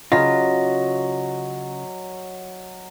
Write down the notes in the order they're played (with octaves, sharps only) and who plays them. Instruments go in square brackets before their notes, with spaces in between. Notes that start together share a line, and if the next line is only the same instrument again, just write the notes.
[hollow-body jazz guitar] C#3 F4 [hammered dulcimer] F#3 [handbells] D#5